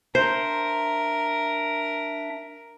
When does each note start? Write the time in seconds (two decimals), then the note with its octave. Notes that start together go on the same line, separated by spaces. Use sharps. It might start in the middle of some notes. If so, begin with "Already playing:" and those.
0.15 D4 A#4 C5 E5